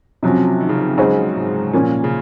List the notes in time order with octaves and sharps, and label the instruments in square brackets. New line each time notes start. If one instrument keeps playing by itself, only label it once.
[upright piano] C3 F#3 C#4 [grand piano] F3
[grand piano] D#3
C#3
D#3
[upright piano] C#3 G#3 D#4 F#4 C5 [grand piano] F#3
[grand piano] G#2
[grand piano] A#2 [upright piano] F3 A#3 C#4
[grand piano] C#3